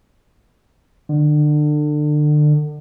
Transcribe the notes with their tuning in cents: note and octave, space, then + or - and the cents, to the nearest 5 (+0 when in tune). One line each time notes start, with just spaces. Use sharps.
D3 +30